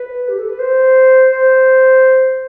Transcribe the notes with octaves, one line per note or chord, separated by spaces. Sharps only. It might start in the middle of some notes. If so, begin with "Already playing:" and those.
Already playing: B4
G4
A4
B4
C5
C5